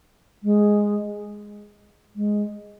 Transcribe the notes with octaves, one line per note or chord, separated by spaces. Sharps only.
G#3
G#3